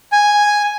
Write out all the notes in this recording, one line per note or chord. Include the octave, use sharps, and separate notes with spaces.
G#5